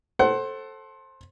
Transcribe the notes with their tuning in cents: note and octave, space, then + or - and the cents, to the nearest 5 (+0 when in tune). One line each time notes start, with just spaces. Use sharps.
A4 +0 C5 +20 F#5 +25